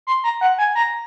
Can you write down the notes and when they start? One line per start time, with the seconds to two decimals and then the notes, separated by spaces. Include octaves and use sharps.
0.07 C6
0.24 A#5
0.41 F#5
0.58 G#5
0.75 A#5